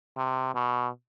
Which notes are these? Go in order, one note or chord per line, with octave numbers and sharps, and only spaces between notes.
C3
B2